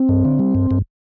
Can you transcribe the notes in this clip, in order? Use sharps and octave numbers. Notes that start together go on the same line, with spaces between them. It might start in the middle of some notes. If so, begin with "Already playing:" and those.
Already playing: C4
G2
D3
G3
G2
G2